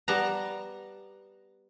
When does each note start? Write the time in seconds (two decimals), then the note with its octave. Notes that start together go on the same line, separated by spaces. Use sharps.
0.08 G3 B3 A5 A#5